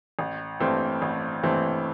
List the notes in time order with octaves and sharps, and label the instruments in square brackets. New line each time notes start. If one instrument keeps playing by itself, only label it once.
[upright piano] A1
G2 E3 A3 C4
A1
G2 E3 A3 C4